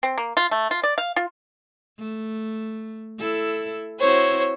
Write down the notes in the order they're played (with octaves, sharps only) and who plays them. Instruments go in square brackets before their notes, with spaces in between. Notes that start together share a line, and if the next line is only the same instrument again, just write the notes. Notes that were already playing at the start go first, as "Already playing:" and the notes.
[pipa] C4
A#3
F4
A3
F4
D5
F5
F4
[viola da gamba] A3
E4 A4
[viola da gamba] C4 E4 F#4 [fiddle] C5 C#5